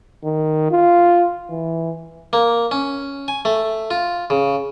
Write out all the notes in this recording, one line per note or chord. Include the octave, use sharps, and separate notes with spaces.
D#3
F4
E3
A#3
C#4
G#5
A3
F4
C#3